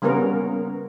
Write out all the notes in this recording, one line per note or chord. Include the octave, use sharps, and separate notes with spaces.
C#3 G3 A#3 B3 C#4 A#4